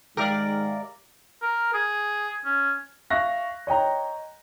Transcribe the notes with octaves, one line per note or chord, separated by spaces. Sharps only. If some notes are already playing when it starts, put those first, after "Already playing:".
G#2 D#3 G#3 G4 A#4 D5 E5 F5
A#4
G#4
C#4
E5 F5 C#6 F#6 A#6
C#5 D#5 G5 A#5